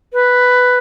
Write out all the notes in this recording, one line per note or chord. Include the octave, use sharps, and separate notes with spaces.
B4